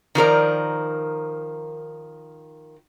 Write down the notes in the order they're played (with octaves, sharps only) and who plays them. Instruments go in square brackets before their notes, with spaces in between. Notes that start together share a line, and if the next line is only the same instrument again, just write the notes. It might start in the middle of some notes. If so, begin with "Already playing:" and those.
[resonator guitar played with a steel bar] D#3 F3 A#4 D5